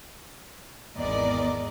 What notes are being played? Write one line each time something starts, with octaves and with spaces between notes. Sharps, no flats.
G#1 E2 A#4 D5 D#5